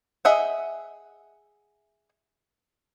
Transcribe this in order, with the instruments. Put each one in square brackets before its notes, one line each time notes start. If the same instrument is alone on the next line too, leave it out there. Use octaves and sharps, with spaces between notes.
[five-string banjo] G#4 D#5 E5 F#5